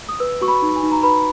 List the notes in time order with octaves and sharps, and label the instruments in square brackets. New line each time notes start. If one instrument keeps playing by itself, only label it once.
[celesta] D#6
B4 E6
F#4 C#6
B5
D#4
G#5
D#4
A#5
B4 B5